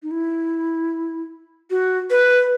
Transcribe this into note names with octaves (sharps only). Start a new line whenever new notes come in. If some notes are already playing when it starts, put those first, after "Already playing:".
D#4
E4
F#4
B4